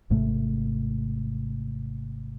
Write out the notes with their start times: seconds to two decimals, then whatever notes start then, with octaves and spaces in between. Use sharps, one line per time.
0.10 G#1 G#2 C3 A3